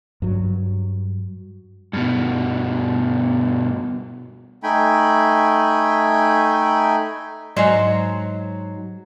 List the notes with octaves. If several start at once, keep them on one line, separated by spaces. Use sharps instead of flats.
G2 F#3
G2 B2
A3 D#4 G5 G#5 B5
G#2 F#3 C5 D5 D#5 G#5